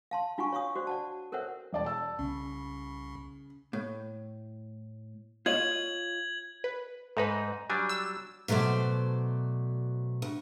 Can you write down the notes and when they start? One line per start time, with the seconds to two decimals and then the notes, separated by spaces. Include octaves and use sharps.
0.11 F5 A5 C6
0.38 D4 F4 F#4 F#5 G#5 C#6
0.53 C#5 F5 C#6 D#6
0.76 F#4 C5 D5
0.87 D5 F#5 A5
1.32 A4 A#4 C5 C#5 E5 F#5
1.73 E1 D5 A5
1.86 A5 E6
2.19 C2 C#3
3.73 A2
5.46 F4 C#5 D#5 G#6 F#7
6.64 B4
7.17 G#2 A3 D#4 B4
7.70 F#3 G3 D4 G#5
7.89 E6
8.48 B2 F#3 A3 C5 D5
10.22 D2